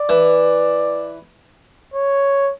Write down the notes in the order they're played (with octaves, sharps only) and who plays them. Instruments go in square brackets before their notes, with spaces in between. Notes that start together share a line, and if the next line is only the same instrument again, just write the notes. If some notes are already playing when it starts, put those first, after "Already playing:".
Already playing: [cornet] D5
[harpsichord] E3
[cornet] C#5